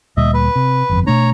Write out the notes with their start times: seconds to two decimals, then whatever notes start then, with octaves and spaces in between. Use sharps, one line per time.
0.17 D2 A#2 G3 D#5 E5
0.34 B4
0.56 C3
0.89 G1 F2
1.07 B2 A3 D4 C#5 A#5